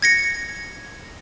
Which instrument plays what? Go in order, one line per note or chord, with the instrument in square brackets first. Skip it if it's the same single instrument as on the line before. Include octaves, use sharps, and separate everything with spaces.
[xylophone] G#6 A#6 C#7